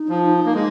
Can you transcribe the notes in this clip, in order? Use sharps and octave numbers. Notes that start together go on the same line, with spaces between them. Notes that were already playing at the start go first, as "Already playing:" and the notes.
Already playing: D#4
F3
A#3
G#3